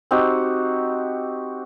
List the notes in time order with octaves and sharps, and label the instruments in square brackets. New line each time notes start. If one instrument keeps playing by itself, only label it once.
[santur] C4 D#4 F#4 G4